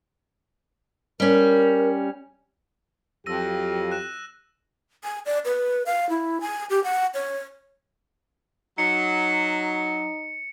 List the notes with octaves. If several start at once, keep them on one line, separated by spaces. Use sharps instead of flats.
G3 C#4 A#4
F2 F#3 G4 E6 A#6 D#7
F#6 E7
G#5
D5
B4
F5
E4
G#5
G4
F#5
C#5
F#3 D#4 C#7